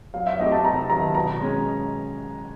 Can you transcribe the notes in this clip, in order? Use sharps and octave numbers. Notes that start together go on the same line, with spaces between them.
F#3 F5
E5
A3 C4 D#4 G4 D#5
A5
C3 A#5
D#3 F#3 A#5
B2 A#5
G#3 C#4